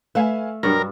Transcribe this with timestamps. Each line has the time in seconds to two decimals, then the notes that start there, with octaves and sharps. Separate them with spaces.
0.15 A3 B4 E5 F5 G#5
0.63 G2 F#3 G3 A#4